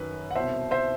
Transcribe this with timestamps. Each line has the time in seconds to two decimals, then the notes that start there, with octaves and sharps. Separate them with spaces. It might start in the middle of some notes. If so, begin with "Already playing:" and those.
Already playing: F#2 D#3 B4
0.31 F#5
0.35 C2 B2 C5 E5
0.71 C5 E5